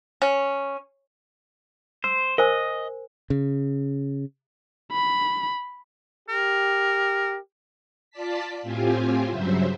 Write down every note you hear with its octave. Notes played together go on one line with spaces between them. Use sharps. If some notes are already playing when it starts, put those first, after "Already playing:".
C#4
C5 E6
A#4 C5 D#5 G#5
C#3
B5
G4 A#4
F4 D5 A5 B6
A2 C4 F4 G4 G#5
G2 C#3 F#3 C5 E5